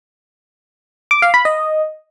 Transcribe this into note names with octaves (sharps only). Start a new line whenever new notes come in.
D6
F5
B5
D#5